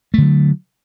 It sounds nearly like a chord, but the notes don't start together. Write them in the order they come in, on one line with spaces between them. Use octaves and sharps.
A3 D3 F#3